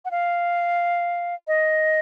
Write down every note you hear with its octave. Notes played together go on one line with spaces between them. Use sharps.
F#5
F5
D#5